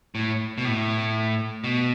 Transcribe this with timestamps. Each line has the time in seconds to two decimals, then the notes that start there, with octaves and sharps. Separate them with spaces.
0.15 A2
0.58 B2
0.65 A2
1.64 B2